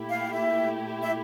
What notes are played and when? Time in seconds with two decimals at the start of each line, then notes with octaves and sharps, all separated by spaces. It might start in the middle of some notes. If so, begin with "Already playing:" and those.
Already playing: A#2 A3 E4 G4
0.09 F5
0.34 E5
1.03 E5